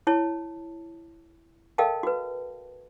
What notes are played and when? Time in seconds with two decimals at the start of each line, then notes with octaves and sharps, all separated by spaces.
0.07 E4 C#5 A5
1.78 A4 A#4 D#5 F5 G5 A5
2.03 F#4 B4